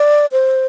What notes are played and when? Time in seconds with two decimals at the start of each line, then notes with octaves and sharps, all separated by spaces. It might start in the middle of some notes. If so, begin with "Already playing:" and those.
Already playing: D5
0.32 C5